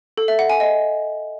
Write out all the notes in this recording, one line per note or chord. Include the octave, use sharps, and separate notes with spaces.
A4
E5
F#5
G#5
D#5